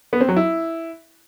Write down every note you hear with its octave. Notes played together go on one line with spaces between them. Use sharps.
B3
C4
F#3
E4